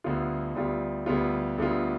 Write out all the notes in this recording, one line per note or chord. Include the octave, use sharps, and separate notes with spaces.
D2 D3 G3 B3 F4
D2 D3 G3 B3 F4
D2 D3 G3 B3 F4
D2 D3 G3 B3 F4